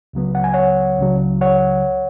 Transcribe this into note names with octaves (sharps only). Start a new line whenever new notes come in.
C#2 C#3 F#3 B3
F#5
G#5
C#5 F#5
C#2 C#3 F#3
C#5 F#5